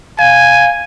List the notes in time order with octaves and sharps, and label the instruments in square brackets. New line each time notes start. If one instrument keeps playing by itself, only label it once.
[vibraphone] F5 [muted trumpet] G#5